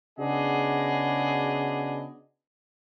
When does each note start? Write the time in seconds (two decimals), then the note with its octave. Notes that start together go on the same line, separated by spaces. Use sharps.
0.19 C#3 B3 D4 F#4 G#4 D#5